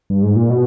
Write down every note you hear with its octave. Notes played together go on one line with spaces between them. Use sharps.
G2
G#2
A#2
B2